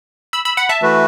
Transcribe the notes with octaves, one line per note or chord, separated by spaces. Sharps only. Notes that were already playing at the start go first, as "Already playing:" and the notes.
B5 E6
B5 E6
F#5 B5
E5 A5
E3 A3 F#4 B4